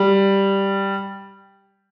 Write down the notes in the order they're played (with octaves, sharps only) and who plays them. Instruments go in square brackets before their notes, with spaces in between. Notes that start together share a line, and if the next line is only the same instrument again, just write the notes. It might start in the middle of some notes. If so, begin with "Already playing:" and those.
Already playing: [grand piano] G3